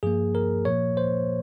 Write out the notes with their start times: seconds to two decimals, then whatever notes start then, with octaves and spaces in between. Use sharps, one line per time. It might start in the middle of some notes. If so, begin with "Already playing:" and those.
0.03 G2 F3 A#3 G#4
0.35 A#4
0.65 A#2 F3 A#3 C#5
0.97 C5